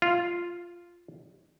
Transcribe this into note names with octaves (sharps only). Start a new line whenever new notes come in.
F4